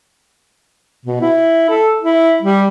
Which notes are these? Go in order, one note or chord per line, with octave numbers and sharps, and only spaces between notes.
B2
E4
A4
E4
G3